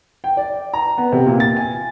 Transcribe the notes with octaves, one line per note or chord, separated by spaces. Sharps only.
G5
D5
A#5
B3
C3
A#2
A6
G#5